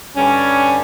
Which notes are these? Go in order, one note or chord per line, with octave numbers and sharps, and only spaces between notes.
G2 D3 G3 C#4